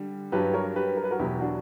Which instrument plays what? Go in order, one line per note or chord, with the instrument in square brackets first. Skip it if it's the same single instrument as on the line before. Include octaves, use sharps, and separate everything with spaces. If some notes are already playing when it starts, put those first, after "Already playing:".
Already playing: [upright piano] D3 G3
G2 F#3 G4 B4
A#4 C#5
G4 B4
A#4
B4
F#4 A#4
E2 B2 F#3 E4 G4
D4 F#4